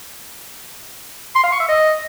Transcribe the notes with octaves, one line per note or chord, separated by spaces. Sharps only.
C6
F5
C#6
E5
D#5